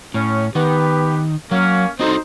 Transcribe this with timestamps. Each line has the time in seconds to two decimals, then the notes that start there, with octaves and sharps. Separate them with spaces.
0.14 A2 C#4
0.55 D#3 B3 G4 B4
1.51 F#3 A#3 C#4
2.00 C4 D#4 F#4 A4 C5